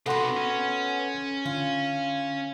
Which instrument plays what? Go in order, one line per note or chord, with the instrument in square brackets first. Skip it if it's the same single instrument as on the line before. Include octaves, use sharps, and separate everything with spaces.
[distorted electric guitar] C3 D#4 [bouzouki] B3 F#4 [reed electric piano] A4 F#5 C6
[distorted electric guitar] C#4
[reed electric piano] D3 [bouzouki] F4